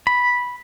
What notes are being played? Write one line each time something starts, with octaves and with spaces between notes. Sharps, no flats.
B5